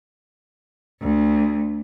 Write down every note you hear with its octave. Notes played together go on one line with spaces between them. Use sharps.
D2